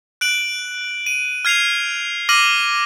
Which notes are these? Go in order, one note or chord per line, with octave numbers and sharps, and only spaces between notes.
F#6 D7 F#7
D#7
F6 G#6 C7 D#7 F7
D6 F6 A#6 D#7 F#7